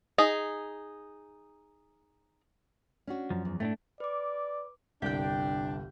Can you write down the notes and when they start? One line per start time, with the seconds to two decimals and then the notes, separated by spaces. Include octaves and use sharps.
0.18 D#4 G#4
3.07 C#4 D4 F#4
3.30 F#2 F3
3.45 E2
3.60 A2 A3 C#4 D4
4.00 B4 D5 D6
5.02 G1 C2 D4 G4 G5